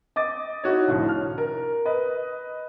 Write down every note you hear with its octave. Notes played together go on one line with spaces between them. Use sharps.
D#5 D6 A6
D#4 E4 F#4 C#5
C2 F2 A2 D3
F6
A#4
B4 D#5